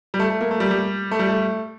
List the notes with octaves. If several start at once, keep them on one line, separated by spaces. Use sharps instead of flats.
G3
A3
A3
A#3
A3
G3
G3
A3
G3
A3